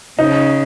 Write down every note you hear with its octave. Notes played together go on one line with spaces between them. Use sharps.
C#3 D#4